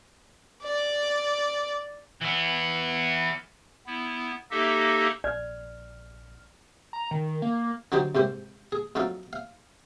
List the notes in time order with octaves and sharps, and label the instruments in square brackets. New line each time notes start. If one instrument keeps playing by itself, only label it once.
[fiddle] D5
[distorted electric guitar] E3 B3
[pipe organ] B3 E4
A#3 D#4 G4 A4 D#5 E5
[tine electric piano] A#1 F6 [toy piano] D5
[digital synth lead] A#5
D#3
A#3
[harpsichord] D3 F#3 D#4 G4 C5
C2 G#2 G4 C5
G#4
F2 F#3 D#4 A4 F5
F5